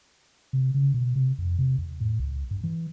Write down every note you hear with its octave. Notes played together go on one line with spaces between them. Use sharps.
C3
C#3
B2
C3
F2
C3
E2
A2
C#2
G2
E3